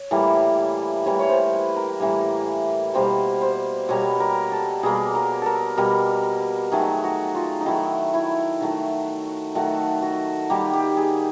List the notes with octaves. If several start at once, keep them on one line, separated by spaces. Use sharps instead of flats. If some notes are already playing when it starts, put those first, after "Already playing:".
Already playing: C#5
A2 E3 G3 A#3
A2 E3 G3 A#3 C#5
C#5
C5
B4
A#4
A2 E3 G3 A#3
B2 G3 A#3 C5
C5
B2 G3 A#3 C#5
A#4
A4
B2 G3 A#3 G#4
A#4
A4 A#4
B2 G3 A#3 A#4
D#3 F#3 A3 G#4
F#4
F4
D#4
D#3 F#3 A3 E4
E4
D#3 F#3 A3
D#3 F#3 A3 F#4
F#4
D#3 G3 A#3 G4
G4
G#4